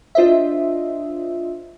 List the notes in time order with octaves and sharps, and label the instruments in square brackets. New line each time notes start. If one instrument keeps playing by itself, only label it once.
[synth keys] D4 F4 C5 D#5 E5